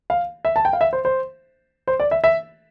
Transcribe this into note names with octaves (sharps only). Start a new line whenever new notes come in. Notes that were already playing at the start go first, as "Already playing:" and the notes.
F5
E5
A5
G5
F5
E5
C5
C5
C5
D5
E5
E5